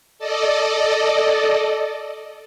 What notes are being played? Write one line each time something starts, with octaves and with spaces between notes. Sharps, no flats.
A4 D5 D#5